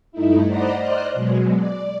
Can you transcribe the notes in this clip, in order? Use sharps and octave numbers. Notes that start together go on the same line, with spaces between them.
G2 A3 D#4 E4
C5 D5 D#5 F#5 A#5 B5
C5 D5 D#5 C6 F6 F#6
B2 F#3 G#3
D5